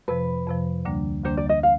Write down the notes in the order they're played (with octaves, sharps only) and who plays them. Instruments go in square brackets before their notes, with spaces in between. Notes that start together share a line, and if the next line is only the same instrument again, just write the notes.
[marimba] F2 C3 F3 [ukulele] B4
[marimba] F2 C3 F3
D2 D3 G3 A#3 D4
[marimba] D2 D3 G3 A#3 D4 [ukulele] C5
[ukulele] D5
D#5
F5